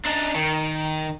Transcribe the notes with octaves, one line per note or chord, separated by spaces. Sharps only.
D4 D#4
D#3